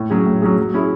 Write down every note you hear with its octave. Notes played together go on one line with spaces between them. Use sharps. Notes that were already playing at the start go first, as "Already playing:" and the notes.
Already playing: A2
F#3 C#4 G#4
A2
F#3 C#4 G#4
F#3
C#4 E4 G#4 C#5